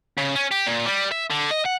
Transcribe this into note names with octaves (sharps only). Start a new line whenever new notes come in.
C#3
C#4
G4
A#2
G3
E5
D3
D#5
F#5